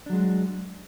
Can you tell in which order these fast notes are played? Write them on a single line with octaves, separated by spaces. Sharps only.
D4 F#3 G#3